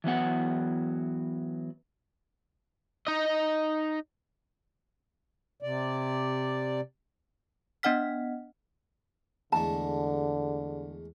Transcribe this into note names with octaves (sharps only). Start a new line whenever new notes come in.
E3 F#3 B3 F#5
D#4 D#5
C3 D5
B3 D4 D#5 F#5 F6 B6
E2 D3 G#3 A3 A5